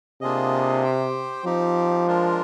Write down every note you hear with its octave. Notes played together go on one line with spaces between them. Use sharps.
C3 A#3 D4 F4 G#4 D#5
G4 C5 G5
F3 C4 D#4 G4
G#3 D4 F4 A#4